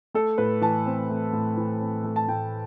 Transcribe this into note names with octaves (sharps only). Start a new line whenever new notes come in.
A3 A4
A2 B4
E3 A5
C4
A3
A2
E3
C4
A3
A5
A2 G5